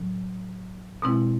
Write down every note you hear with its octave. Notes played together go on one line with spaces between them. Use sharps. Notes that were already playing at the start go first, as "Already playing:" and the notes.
Already playing: A2 F#3
B2 G#3 C4 E4